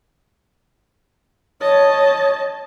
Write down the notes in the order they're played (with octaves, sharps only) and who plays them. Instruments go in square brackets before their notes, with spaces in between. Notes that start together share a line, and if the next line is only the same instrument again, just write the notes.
[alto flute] C#5 [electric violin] D#5 A5